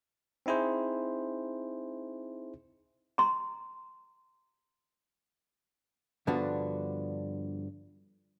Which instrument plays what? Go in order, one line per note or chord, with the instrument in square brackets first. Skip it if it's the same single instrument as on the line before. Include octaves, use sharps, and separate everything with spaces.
[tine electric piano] C4 D#4 E4 G#4 C5
[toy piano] A#5 C6
[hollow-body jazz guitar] G2 D3 F3 B3 D4 F#4